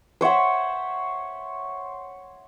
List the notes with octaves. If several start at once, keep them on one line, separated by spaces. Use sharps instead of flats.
C5 C#5 E5 F#5